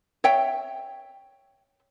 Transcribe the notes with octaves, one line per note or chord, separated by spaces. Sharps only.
C#5 E5 G5